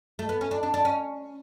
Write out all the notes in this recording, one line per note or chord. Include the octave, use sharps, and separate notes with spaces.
A3
B3
C#4
D4
D4
D4
C#4